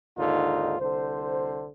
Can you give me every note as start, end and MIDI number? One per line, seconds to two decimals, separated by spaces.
0.18 0.75 39
0.18 0.75 44
0.18 0.75 50
0.18 0.75 63
0.18 0.75 65
0.80 1.68 36
0.80 1.68 50
0.80 1.68 72